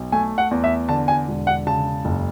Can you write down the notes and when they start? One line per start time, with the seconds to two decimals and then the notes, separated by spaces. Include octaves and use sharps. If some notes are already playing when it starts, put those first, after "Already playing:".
Already playing: B1
0.12 A3 G#5
0.38 F#5
0.51 E2
0.64 E5
0.89 D3 A5
1.08 G#5
1.28 E1
1.47 F#5
1.67 C#3 A5
2.05 F#1